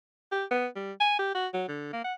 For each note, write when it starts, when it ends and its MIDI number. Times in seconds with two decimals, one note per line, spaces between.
0.32 0.44 67
0.51 0.67 59
0.76 0.92 55
1.00 1.17 80
1.19 1.32 67
1.34 1.47 66
1.53 1.68 54
1.68 1.91 50
1.93 2.01 58
2.04 2.14 78